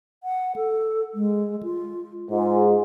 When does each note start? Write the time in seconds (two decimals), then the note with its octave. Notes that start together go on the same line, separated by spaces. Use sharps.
0.23 F#5
0.56 A4
1.15 G#3
1.63 F4
2.30 G#2 F4